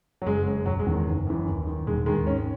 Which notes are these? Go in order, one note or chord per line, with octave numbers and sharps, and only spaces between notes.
F#3
F#1 G#3
F#2 C#3
E1 F#3
G#3
E2 D#3
F#1
F#2 E3
D#2
D#3
E1 G#3
D#2 D#3 G#3
G#1 C#4